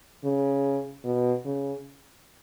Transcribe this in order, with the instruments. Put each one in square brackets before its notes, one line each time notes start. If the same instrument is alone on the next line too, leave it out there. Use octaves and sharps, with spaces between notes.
[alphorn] C#3
B2
C#3